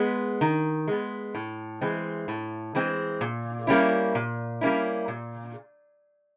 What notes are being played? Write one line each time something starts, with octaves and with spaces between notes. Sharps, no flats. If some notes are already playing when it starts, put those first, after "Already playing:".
Already playing: G#3 B3
D#3
G#3 B3
A2
E3 G#3 C4
A2
E3 G#3 C4
A#2
G3 A#3 C#4 E4
A#2
G3 A#3 C#4 E4
A#2